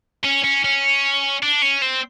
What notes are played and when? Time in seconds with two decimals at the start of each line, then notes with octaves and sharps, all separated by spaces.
0.25 C#4
0.44 C#4
0.65 C#4
1.43 D4
1.62 C#4
1.82 C4